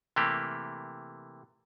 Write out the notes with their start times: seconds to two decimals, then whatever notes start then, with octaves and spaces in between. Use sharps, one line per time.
0.16 C3 E3 A3 A#3 G4